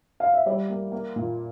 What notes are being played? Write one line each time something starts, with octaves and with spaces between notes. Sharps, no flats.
F5
E5
G3 D5
A#3
A#3
A#2